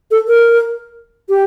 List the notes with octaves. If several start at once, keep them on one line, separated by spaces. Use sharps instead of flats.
A4
A#4
G4